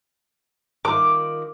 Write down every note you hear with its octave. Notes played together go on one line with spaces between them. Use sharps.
D#3 F4 D6